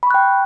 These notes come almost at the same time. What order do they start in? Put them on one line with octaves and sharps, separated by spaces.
B5 C#6 F#6 G5